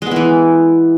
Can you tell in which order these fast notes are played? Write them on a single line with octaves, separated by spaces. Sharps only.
G#3 B3 E4 E3